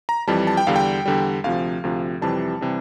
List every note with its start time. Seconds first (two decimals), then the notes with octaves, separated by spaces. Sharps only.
0.09 A#5
0.27 F2 E3 G3 A5
0.47 A5
0.57 G5
0.67 E2 D3 G3 F5
0.76 G5
1.06 E2 D3 G3
1.44 D2 C3 F3 F5
1.84 D2 C3 F3
2.21 F2 C3 E3 G3 A5
2.61 C3 E3 G3